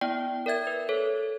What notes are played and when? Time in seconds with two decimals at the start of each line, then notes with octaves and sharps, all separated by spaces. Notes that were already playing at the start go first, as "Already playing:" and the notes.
0.01 B3 E4 D5 G5
0.46 A#4 D5 E5 G#6
0.67 B4
0.89 A4 C#5